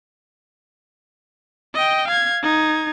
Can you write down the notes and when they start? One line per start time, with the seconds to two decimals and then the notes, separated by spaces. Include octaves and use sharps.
1.74 D#5 G5
2.08 F5 G#6
2.42 D#4 G#6